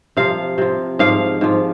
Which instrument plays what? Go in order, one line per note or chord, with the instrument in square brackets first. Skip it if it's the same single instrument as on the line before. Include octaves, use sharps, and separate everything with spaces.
[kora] C3 F3 F5
C3 F3
G#2 F3 F5
G#2 F3